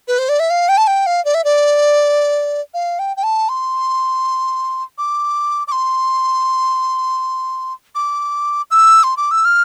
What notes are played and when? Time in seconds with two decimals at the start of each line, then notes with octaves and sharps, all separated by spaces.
0.08 B4
0.18 C5
0.29 D5
0.40 E5
0.50 F5
0.69 G5
0.77 A5
0.87 G5
1.06 F5
1.25 D5
1.34 E5
1.44 D5
2.74 F5
2.99 G5
3.17 G5
3.23 A5
3.49 C6
4.98 D6
5.67 D6
5.72 C6
7.95 D6
8.71 E6
9.03 C6
9.17 D6
9.31 E6
9.45 F6